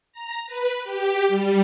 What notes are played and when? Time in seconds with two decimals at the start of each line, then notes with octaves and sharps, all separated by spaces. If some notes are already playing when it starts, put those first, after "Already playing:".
0.12 A#5
0.46 B4
0.83 G4
1.28 G3